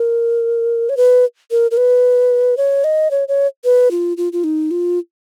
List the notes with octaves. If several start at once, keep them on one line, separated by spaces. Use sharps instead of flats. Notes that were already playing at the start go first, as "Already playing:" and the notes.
Already playing: A#4
C#5
B4
A#4
A#4
B4
C#5
D#5
C#5
C#5
B4
F4
F4
F4
D#4
F4